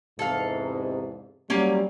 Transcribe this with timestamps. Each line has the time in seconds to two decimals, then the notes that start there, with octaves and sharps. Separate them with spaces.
0.19 E2 G#2 C3 A4 F5
1.50 F#3 G3 A#3 C#4